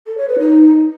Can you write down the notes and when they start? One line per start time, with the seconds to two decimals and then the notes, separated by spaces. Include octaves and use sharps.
0.07 A4
0.18 C#5
0.28 B4
0.39 D#4